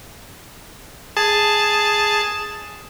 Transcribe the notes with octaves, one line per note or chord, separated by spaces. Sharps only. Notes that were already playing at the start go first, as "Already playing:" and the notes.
G#4 A5